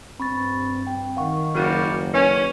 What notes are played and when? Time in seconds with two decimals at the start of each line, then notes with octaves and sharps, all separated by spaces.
0.20 G2 C4 B5 C#6 A6
0.87 G5
1.17 D#3 F5 F#5 C#6
1.54 F#1 G3 A#3 F#4
2.13 C#4 B4